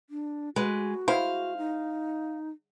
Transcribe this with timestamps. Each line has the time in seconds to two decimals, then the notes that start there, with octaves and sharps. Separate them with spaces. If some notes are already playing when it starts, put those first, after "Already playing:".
0.10 D4
0.56 G#3 F#4 B4
1.08 G#3 E4 C5 F5
1.58 D#4